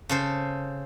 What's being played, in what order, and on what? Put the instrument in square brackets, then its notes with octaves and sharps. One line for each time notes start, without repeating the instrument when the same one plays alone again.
[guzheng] C#3 A4 C5